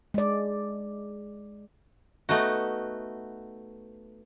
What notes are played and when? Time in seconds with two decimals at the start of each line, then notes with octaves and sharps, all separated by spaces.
0.14 G#3 D5
2.29 A3 B3 D#4 F#4